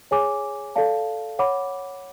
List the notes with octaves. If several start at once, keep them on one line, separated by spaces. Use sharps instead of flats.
G#4 C#5 G#5 D6
A4 D5 F5 A5
C#5 F#5 B5 D6